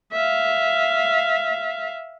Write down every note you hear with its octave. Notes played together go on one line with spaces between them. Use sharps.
E5 F5